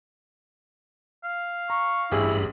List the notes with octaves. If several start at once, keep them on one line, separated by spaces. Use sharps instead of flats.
F5
A#5 C#6
A1 G2 E4 G4 G#4 B5